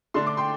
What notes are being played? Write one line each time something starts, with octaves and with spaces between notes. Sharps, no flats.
D3 A3 D4 C6
D6
G5 C6